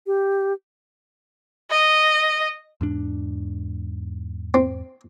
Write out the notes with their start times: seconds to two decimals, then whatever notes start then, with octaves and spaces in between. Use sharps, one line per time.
0.07 G4
1.71 D#5
2.81 E2 G#2 D4
4.54 C4